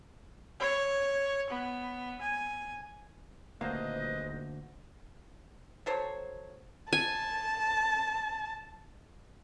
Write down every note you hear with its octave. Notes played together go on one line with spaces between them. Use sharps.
C#5
B3
G#5
D#1 D2 A#3 B4 C5 D#5 F5
F#3 A4 C5 C#5
G#5 A5